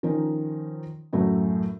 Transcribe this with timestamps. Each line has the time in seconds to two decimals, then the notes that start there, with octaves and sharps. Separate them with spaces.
0.03 D#3 F3 C#4 D#4
1.13 F#2 A2 F#3 A3